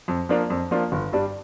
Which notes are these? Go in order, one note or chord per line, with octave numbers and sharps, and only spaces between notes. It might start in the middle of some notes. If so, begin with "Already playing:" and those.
F2
F3 A#3 D4 F4
F2
F3 A#3 D4 F4
G1
G2 G3 D4